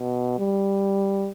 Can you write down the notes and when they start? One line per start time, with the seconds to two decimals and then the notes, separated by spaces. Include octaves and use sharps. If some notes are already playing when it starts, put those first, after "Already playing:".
Already playing: B2
0.38 G3